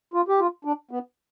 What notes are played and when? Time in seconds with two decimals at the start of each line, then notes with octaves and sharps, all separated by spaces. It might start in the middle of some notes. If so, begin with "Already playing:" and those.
0.14 F4
0.28 G4
0.39 F4
0.65 D4
0.91 B3